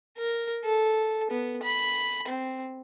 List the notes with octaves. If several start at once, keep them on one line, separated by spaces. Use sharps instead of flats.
A#4
A4
B3
B5
C4